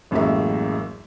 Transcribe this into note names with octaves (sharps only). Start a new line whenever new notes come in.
A1 F#2 A2 G#3 A#3 E5